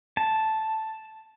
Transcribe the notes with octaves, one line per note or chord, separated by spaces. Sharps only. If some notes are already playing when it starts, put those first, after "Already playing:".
A5